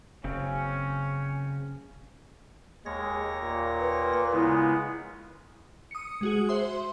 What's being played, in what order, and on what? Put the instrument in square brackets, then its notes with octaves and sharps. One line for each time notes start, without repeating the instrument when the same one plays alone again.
[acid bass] F#1 [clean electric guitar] C#3 C4 [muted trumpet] C#4
[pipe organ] D#2 C#5 A#6 [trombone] G#3
[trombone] A#2
[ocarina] B4
[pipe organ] C#3 G#3 B3 [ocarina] E4
[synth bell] D#6 C#7
G#3 F#4 G#4
C5 E5 C6